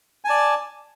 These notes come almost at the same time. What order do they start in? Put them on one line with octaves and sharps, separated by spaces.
G#5 A5 D5